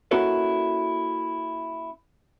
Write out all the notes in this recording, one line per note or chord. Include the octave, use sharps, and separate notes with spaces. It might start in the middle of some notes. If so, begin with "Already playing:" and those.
A#3 C#4 E4 F#4 A4 B4